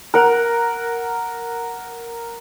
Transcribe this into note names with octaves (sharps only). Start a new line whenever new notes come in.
A#4 F#5